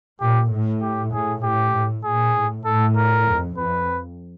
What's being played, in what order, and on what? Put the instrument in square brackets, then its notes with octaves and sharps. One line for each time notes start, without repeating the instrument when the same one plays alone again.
[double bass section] A#2 [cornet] G4
[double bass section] A2
[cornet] G4
[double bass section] A2 [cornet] G#4
[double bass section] A2 [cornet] G4
[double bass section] A2
[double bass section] A#2 [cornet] G#4
[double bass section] A2
[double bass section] A2 [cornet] A4
[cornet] A#4
[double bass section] F2
[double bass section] F2 [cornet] B4